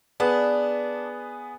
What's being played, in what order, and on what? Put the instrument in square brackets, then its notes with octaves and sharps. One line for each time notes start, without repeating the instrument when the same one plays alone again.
[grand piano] B3 G#4 B4 [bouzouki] D4